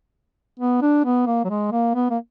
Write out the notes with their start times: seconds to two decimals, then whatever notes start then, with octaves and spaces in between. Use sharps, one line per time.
0.59 B3
0.82 D4
1.05 B3
1.26 A#3
1.44 F#3
1.49 G#3
1.72 A#3
1.95 B3
2.10 A#3